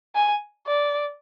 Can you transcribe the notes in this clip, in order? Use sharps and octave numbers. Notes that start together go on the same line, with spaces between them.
G#5
D5